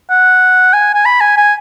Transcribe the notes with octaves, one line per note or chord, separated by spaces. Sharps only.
F#5
G#5
G#5
B5
G#5
G#5